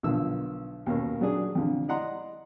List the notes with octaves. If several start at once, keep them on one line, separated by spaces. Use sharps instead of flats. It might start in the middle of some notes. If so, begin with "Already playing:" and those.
B1 D3 D#3 F3 E6
D#2 B2 C#4 A#4
F#3 C#4 D4 G#4
F2 D3
E4 D5 D#5 F#5 A#5 C6